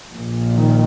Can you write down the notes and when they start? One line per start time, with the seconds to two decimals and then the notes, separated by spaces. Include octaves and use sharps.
0.14 A#1 A#2
0.56 D#3